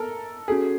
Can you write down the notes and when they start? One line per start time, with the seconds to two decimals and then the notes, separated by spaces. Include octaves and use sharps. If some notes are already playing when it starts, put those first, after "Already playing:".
Already playing: A4 A#4
0.48 C#4 F#4 G#4 A4